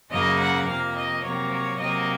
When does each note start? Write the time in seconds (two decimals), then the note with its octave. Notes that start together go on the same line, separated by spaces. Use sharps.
0.11 F#2 C#3 F#3 A#3 D#5
0.39 F#5
0.67 F2 C3 F3 A#3 F5
0.96 D#5
1.24 C3 F#3 A#3 C#5
1.52 C#5
1.80 C3 F#3 A#3 D#5